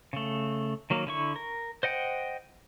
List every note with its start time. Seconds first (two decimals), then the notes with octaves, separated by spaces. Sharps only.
0.13 C#3 A3
0.90 D#3 F#3 A#3
1.07 D3 E4 C#6
1.36 A#4
1.83 C5 D#5 F#5 G5